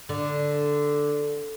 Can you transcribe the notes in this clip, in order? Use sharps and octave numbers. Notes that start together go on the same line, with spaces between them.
D3